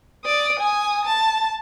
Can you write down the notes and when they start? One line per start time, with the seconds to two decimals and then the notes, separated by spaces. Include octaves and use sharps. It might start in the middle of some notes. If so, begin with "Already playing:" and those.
0.25 D5 D#6
0.59 G#5 D#6
1.05 A5